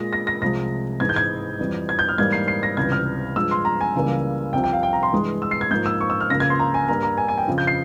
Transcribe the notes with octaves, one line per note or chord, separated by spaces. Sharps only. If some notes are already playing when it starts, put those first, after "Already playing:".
Already playing: A#2 G#3 A#6
A#6
A#6
C2 C3 F3 G#3 A#6
G#2 E3 G#3 G#6
G6
G#6
F2 E3 G3
G#6
G6
F6
G#2 E3 G3 A#3 G#6
C7
C7
A#6
C#2 C3 E3 G3 G#6
F6
G2 F3 G#3 E6
C6
A#5
G#5
C#2 C#3 E3 G3 A#3
C2 C3 F3 G5
G5
F5
G5
A#5
C6
G2 E3 G#3
E6
C7
G#6
G#2 F3 A#3 G6
E6
C#6
E6
F6
C#2 C#3 F3 A#3 A#6
G#6
C6
A#5
G#5
G2 G3 A#3 A#5
A#5
G#5
G#5
G5
F2 C#3 F3
G6
C7